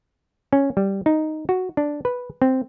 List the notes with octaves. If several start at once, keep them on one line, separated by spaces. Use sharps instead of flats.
C#4
G3
D#4
F#4
D4
B4
C4